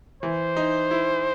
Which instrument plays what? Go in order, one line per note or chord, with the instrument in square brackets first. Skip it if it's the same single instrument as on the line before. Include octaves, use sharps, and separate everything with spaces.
[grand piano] E3 [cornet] C5
[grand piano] D#4
E4